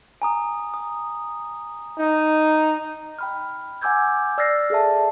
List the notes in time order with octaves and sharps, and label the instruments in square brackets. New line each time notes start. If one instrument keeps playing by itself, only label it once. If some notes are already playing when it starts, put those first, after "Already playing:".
[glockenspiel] G#5 A#5 D#6
D#6
[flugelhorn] D#4
[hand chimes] G5 B5 F6
F#5 G#5 D6 E6 G6 G#6
D5 E6 F6 A6 A#6 C7
G#4 A4 D5 E5 A5